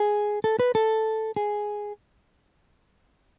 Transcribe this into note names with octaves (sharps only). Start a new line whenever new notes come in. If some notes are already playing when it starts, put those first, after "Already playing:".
Already playing: G#4
A4
B4
A4
G#4